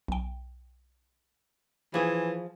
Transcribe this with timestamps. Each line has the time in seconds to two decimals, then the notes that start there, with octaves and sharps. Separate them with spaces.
0.08 B1 G5
1.94 E3 F3 G#4